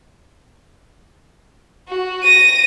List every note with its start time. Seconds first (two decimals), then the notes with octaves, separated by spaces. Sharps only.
1.88 F#4
2.24 A#6 D#7